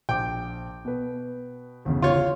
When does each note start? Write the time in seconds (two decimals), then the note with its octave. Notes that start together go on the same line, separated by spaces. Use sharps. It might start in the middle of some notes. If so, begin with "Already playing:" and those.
0.09 A#1 G5 D6
0.85 B2 B4
1.85 G1 E2 C#3
2.02 F4 C#5